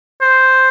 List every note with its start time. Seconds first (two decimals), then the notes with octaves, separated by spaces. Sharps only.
0.21 C5